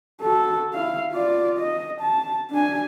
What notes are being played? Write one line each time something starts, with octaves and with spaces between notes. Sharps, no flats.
F#4 A4
E4 F5
F4 D5
D#5
A5
D4 G#5